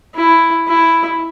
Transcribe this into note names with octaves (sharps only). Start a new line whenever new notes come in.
E4
E4